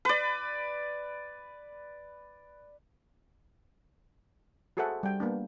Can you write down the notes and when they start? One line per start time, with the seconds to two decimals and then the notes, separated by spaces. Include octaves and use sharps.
0.05 B4 D5
4.77 F#4 G#4 A4 C5 E5 F#5
5.03 G3 G5
5.20 A#3 B3 D4